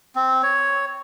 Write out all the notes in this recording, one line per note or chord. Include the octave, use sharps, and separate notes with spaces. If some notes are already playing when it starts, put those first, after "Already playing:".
C4
C#5